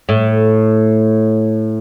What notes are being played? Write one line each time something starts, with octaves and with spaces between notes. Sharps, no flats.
A2